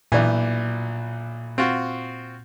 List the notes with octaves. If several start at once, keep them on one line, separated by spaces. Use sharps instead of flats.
B1 A#2 E3 D5
C4 F4 F#4